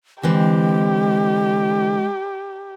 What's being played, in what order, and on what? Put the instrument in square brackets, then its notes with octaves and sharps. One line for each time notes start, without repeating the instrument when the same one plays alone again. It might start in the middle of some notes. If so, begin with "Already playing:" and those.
[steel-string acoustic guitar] D3 E3 C4 [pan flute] G#3 [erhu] G4